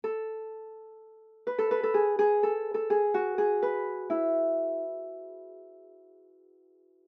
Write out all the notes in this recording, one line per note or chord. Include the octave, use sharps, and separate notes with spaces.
A4
B4
A4
B4
A4
G#4
G#4
A4
A4
G#4
F#4
G#4
B4
E4